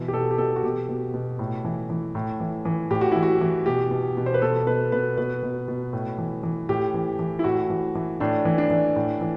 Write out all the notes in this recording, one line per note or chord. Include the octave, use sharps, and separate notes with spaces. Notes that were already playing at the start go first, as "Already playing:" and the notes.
Already playing: B2 E3
G4
B2 A4
G4
B2 A4
F#4
B2 G4
B2
B2
A2
E3
E3
A2
E3
E3
A2 G4
F#4
E3 E4
F#4
E3
B2 G4
B2
B2
C5
B4
B2 A4
B2 B4
B2 B4
B2 B4
B2
B2
A2
E3
E3
A2 G4
E3
E3
E4
A2 F#4
E3
E3
A2 D4
E3
D4
E3
A2
E3